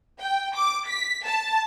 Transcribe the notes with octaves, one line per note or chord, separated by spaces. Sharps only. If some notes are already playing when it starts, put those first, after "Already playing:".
G5
D6
B6
A5